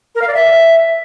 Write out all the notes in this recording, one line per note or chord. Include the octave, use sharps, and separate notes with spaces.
A#4
F5
D5
E5